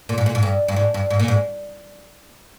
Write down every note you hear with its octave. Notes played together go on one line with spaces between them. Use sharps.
A#2
G#2
A#2
G#2
G2
G2
G#2
G2
G#2
A#2
G#2